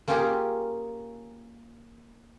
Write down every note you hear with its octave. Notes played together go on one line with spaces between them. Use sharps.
A#3 C#4 F4 G4 G#4 A#4